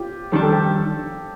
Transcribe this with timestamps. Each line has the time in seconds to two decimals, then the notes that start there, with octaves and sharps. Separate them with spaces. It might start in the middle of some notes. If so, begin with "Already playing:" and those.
Already playing: F4 G4
0.32 F2 D#3 G3 D4 G4
0.42 A4
0.52 G4